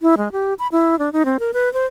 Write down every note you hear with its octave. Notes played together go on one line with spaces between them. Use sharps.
E4
G#3
G4
B5
E4
D4
D#4
C4
A#4
B4
C5